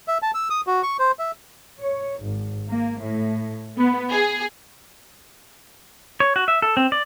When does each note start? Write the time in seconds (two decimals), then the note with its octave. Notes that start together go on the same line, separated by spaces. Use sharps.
0.08 E5
0.22 A5
0.35 E6
0.50 D#6
0.67 F#4
0.83 C#6
0.99 C5
1.19 E5
1.79 C#5
2.21 G#1
2.69 A#3
3.01 A2
3.77 B3
4.11 G#4
6.20 C#5
6.36 F#4
6.48 E5
6.62 A4
6.77 C4
6.92 D5